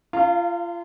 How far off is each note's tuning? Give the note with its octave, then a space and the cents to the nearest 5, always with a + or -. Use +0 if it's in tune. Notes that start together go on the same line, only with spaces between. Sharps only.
F4 -30 F5 +0 A#5 -45